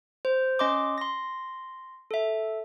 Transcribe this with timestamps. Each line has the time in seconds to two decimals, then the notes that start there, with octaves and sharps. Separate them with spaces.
0.25 C5
0.59 C#4 D#5 C6 D6
0.98 C6 A#6
2.11 A4 E5